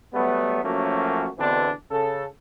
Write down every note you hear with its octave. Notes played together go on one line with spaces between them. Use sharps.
F#3 G3 A3 B3
F#2 F3 A3 A#3 C#4 F#4
E2 B2 D3 E3 C4 D4
C#3 A4